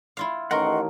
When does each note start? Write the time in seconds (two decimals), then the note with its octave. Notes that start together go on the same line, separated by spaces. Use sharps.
0.17 E4 F4 F5
0.51 A1 D#3 A#4 D#5 F#5 C6 C#6